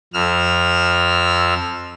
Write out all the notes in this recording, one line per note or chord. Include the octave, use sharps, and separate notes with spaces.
F2 E6 F6